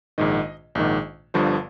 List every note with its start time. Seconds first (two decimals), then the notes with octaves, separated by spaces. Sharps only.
0.18 A#1 G#2 D#3 D#5
0.75 A#1 G#2 D#3
1.34 G1 G2 D3 F3 C5